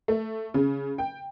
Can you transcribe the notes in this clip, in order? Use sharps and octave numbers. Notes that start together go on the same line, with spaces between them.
A3
C#3
G5